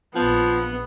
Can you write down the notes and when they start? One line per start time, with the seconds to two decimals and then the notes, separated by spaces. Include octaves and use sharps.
0.15 A#1 F3 B3